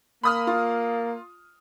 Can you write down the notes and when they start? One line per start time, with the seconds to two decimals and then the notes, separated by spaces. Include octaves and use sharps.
0.23 A#3 B5 D#6 F6
0.47 F4